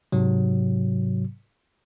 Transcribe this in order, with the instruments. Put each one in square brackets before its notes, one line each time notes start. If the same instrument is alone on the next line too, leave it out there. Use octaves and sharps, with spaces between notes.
[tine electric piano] G#2 C3 F#3